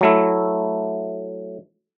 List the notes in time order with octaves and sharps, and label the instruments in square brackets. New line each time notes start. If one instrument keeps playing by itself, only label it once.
[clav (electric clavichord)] F#3 A3 E4